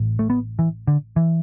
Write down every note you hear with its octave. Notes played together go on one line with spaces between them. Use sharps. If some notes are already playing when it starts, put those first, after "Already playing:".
Already playing: A1 A2
A3
B3
E3
D3
E3